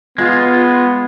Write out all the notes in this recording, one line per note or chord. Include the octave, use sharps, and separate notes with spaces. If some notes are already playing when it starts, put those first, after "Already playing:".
G#3 B3 F4